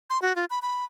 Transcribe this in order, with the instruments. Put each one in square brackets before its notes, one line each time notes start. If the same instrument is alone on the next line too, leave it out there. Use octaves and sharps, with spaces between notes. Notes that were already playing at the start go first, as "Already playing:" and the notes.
[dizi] C6
F#4
F4
B5
B5